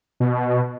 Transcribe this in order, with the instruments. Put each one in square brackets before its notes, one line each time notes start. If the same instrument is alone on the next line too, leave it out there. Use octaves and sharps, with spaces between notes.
[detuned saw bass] B2